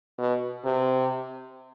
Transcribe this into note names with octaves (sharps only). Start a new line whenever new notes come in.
B2
C3